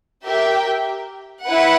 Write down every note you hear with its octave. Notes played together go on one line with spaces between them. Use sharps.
G4 A#4 E5 G5
E4 B4 F#5